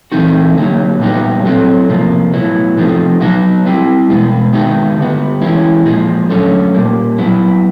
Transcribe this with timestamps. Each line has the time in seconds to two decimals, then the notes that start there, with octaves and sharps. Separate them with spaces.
0.12 E3 A3 C4 D#4 F#4
0.56 D3 F#3 A#3 D#4
1.00 A#2 G3 B3 D#4 F#4
1.44 A2 F#3 A3 C4
1.89 C3 F3 A#3
2.33 A2 F#3 B3 E4
2.76 C3 F3 A3 C4 D#4
3.20 F#3 B3 D#4 F#4
3.66 G3 C4 E4
4.09 B2 G#3 B3
4.53 D#3 G#3 B3 D#4 F#4
4.98 D3 G3 B3
5.42 E3 G#3 C#4 E4
5.85 A#2 F3 G#3
6.29 D3 F#3 A3 C#4
6.74 A#2 G3 A#3
7.18 F#3 B3 E4